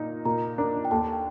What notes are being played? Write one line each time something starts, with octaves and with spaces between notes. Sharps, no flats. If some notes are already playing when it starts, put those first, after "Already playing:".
Already playing: A#2 D#4
A#2 A#4 A#5
D4 A#4 A#5
G5
D#2 A4 A5
G5